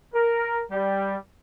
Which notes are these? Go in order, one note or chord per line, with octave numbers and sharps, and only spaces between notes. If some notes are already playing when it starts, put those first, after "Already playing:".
A#4
G3